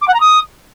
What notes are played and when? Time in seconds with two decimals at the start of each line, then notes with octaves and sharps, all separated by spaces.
0.01 D6
0.07 F#5
0.14 A#5
0.20 D#6